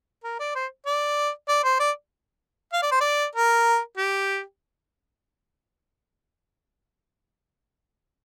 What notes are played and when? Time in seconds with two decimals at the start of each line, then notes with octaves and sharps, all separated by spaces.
0.24 A#4
0.39 D5
0.55 C5
0.86 D5
1.48 D5
1.64 C5
1.80 D5
2.73 F5
2.82 D5
2.91 C5
3.00 D5
3.35 A#4
3.97 G4